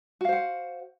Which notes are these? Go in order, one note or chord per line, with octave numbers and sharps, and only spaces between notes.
F#4 C5 F5 F#5